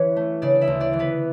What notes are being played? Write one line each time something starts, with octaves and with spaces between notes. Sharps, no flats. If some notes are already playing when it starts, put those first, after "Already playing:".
Already playing: E3 C#4 B4 C#5
A3
C#3 D4 D5
E4 E5
D2
D4 D5
E3
B3 B4